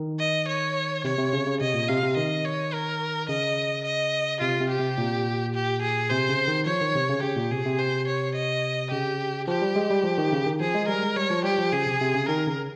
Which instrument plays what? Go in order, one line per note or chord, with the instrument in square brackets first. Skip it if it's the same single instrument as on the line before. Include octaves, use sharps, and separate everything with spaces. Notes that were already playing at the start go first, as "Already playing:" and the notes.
Already playing: [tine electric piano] D#3
[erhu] D#5
C#5
[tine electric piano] C3 [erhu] C#5
[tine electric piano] C3
C#3
C#3
[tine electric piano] C3 [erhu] D#5
[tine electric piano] A#2
[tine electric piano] C3 [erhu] F5
[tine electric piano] C3
[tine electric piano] D#3 [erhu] D#5
[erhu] C#5
A#4
[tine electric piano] C#3 [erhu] D#5
[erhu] D#5
[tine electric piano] C3 [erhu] F4
[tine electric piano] C3
[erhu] G4
[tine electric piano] C3
A#2
[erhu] G4
G#4
[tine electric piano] C3 [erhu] C5
[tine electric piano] C#3
D#3
[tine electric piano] F3 [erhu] C#5
[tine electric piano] D#3
C3
C#3
[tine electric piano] C#3 [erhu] G4
[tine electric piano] A#2
[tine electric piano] C3 [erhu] G#4
[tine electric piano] C3
[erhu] C5
C#5
D#5
[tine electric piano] C#3 [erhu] G4
[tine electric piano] F3 [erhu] G4
[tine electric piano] G3
G#3
G3
F3
D#3
C#3
D#3
[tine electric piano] F3 [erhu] G#4
[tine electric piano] G#3
[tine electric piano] G3 [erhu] A#4
[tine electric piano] G#3
[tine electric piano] G3 [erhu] C#5
[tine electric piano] F3
[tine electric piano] G3 [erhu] G4
[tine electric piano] F3
[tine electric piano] C#3 [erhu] G#4
[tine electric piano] C3
C3
C#3
[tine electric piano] D#3 [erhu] A#4
[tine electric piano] C#3